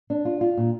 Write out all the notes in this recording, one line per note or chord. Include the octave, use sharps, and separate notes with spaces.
D4
F4
F4
A#2